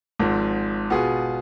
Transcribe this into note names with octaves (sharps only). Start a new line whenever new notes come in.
G#1 G#2 F3
B2 B3 F4 G#4